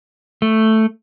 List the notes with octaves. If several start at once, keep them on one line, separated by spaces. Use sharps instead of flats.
A3